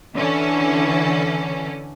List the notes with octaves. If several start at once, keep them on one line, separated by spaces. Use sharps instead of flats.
D3 E3 C#4 A4